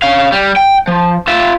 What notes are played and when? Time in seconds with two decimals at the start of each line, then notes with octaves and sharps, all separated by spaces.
0.02 C#4 F5
0.32 G3
0.56 G5
0.87 F3
1.27 F4 E5